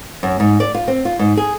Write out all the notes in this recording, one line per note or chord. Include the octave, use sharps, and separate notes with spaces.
F#2
G#2
D5
F4
C4
F4
G#2
G#4